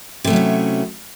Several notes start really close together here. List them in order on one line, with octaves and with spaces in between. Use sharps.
C3 A3 F#3 C#4 E4